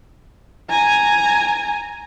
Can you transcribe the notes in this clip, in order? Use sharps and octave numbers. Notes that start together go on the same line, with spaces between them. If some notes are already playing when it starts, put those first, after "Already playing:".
G#5 A#5